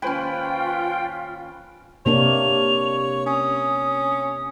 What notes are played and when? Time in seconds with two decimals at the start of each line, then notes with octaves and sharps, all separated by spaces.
0.02 D#2 C#4 F4 B4 C5 G5 G#5
2.06 C3 A#3 D4 C#5 F7
3.26 C#4 D#6